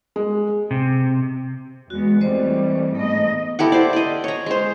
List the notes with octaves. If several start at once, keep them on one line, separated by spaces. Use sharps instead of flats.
G#3
C3
E2 G#3 B3 F#4
E3 G3 A3 C4 C5 D#5
G#2 A3 B3 D#5
E4 G4 A4 F#5
C5 D5
D5 D#5
C#5 A#5
G#3 C5